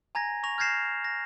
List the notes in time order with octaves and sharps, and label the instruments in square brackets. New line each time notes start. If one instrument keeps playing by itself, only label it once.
[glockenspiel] G#5 A#5 G#6 A#6
C#6 A#6 F7
F6 G6 G#6 A#6 C7 E7
A#6